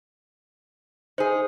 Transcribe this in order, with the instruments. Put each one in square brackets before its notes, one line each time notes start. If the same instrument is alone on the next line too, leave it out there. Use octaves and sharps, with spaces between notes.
[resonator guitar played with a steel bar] D#4 G#4 [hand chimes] C5